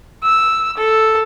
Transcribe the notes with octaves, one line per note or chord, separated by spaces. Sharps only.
E6
A4